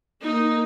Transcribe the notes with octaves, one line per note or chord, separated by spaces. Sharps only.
A#3 D#4